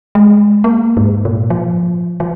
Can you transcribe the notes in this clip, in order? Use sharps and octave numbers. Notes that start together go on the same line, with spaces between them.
G#3
A#3
G#2
A#2
F3
F3